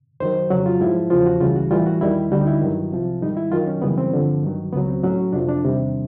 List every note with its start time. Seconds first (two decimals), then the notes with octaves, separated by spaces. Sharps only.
0.20 F#2 D#3 F#3 C5
0.51 F2 C#3 F#3 F#4
0.66 F4
0.81 G#2 F3 E4
1.10 E2 C#3 F3 F4
1.26 F#4
1.40 C#2 C#3 E3 G3 F4
1.56 F#4
1.71 A2 E3 G3 F4
1.86 F#4
2.01 D#2 D#3 G3 E4
2.31 D2 D3 G3 F#4
2.41 D#4
2.47 E4
2.61 G2 D#3 F#3
2.91 C2 C3 F3
3.21 G#2 D#3 G3 D#4
3.37 E4
3.51 F#2 D#3 F#3 F4
3.67 C#4
3.82 F#2 C#3 E3 G3 B3
3.98 C4
4.12 G2 D3 F3
4.43 G2 D#3 F#3
4.73 C#2 C#3 F#3 B3
4.88 C4
5.03 A2 F#3 C#4
5.33 F2 C3 F3 D4
5.49 D4
5.63 E2 C3 D#3 G3